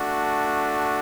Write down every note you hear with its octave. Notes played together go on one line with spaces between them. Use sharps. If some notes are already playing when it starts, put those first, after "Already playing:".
Already playing: A3 D4 F#4